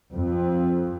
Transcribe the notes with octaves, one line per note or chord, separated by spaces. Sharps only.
F2